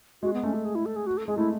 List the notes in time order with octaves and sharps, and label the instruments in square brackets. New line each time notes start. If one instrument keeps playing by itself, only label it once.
[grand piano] G#3 [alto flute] F#4
[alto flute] B3
[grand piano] A3 [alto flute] C#4
[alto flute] A4
G#4
E4
A4
G#4
F#4
A4
[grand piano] G#3 [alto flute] G#4
[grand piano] A3 [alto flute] E4